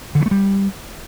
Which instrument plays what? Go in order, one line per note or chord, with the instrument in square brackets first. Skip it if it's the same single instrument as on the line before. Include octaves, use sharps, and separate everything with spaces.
[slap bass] D3
E3
A3
G3